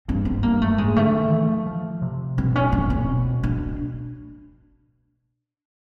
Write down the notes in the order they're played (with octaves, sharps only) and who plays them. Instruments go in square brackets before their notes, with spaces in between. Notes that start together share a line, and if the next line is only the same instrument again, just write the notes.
[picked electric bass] G2 [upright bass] C4
[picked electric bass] G#2 [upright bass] B3
[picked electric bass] G2 [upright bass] A#3
[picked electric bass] F#2 [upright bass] A3
[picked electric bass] G#2 [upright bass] G#3
[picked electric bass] D3 [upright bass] A3
[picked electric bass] D#3
E3
F3
F3
C3
[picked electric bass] B2 [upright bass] C4
[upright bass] C#4
[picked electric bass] A#2 [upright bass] C#4
[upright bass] C4
[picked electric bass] B2
[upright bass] D4